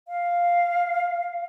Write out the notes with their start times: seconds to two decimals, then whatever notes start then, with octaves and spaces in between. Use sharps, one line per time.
0.08 F5